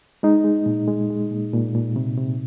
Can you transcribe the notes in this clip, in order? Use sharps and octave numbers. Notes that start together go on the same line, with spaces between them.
G#3 D#4
G#3
A#2
G#3
G#3
A#2
A#2
A#2
C3
C3